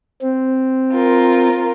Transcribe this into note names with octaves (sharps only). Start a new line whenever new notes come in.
C4
F4 A#4